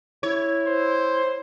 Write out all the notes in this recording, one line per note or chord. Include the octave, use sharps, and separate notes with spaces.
E4 C#5
C5